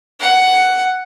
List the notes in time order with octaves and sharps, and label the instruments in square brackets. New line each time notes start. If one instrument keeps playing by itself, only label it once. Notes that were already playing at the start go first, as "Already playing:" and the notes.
[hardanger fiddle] F#5